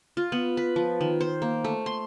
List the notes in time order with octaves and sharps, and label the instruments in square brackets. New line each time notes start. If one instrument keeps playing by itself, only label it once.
[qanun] F4
B3
B4
F3
D#3
C5
A#3
A3
C6